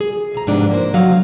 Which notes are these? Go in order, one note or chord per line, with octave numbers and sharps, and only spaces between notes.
G#4
C3 A#5
G#2 C3 F3 B3 D4 G4
A#3 C5
C3 F#3 F5